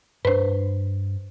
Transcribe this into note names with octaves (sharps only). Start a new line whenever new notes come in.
G2 D4 B4 C5